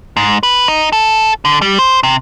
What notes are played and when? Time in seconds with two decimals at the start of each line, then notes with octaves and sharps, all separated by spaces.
0.17 G#2
0.43 B4
0.68 D#4
0.93 A4
1.45 D3
1.62 G3
1.79 C5
2.03 C3